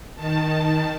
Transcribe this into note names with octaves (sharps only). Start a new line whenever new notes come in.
D#3 A5